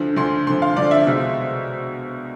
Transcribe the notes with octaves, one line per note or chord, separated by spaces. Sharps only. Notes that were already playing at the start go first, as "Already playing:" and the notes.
Already playing: D2 D3 F3
D2 D3 F3 C6
D2 D3 F3 C6
F5
D2 D3 F3 D5
E5
C2 B2 G#3 C4